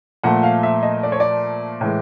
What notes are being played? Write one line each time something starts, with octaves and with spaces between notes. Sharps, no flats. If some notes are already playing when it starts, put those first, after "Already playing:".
A#2 F3 A3 F#5
F5
E5
D#5
D5
C#5
D5
A2 E3 G#3